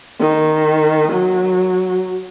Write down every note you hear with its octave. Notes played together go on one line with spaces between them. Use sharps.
D#3
F#3